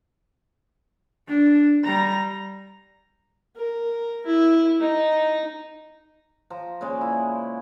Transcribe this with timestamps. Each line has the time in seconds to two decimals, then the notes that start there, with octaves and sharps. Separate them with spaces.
1.28 D4
1.84 G3 A#5
3.57 A#4
4.26 E4
4.81 D#4
6.50 F3 A#5
6.81 A#2 C#3 G#3 D6
7.01 E4